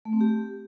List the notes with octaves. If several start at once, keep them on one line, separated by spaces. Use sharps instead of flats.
A3
C4
G4